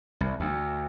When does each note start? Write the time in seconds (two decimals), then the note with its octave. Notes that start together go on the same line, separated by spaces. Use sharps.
0.21 C2
0.40 D2